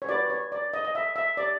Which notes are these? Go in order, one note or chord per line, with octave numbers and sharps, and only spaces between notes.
C#5
F#4 B4 D5
C#5
D5
D#5
D#5
E5
E5
D5